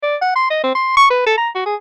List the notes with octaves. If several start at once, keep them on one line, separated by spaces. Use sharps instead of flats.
D5
F#5
C6
D#5
C4
C6
C#6
B4
A4
A#5
F#4
G#4